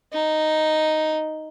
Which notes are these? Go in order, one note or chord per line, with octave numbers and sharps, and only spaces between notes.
D#4